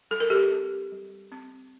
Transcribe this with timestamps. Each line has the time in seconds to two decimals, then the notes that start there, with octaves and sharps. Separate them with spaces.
0.11 G3 A4
0.20 A#4
0.30 G4 A4
0.51 C4
0.92 G3
1.32 C4